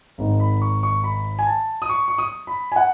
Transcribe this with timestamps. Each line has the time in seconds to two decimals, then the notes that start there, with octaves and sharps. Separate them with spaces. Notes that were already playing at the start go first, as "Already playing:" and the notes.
0.18 G#1 G#2 D#3
0.40 B5
0.61 C#6
0.83 C#6
1.04 B5
1.39 G#5
1.47 A5
1.82 D#6
1.89 C#6
2.08 C#6
2.18 D#6
2.47 B5
2.72 G#5
2.76 F#5